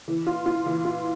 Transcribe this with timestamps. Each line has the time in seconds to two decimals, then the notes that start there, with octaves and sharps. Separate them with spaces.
0.08 E3
0.27 F4
0.46 F4
0.66 E3
0.85 F4